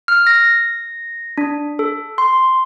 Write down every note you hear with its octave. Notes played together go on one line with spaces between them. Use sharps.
F6
A#6
D4
A4
C6